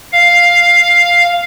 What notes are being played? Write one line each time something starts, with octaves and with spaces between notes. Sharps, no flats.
F5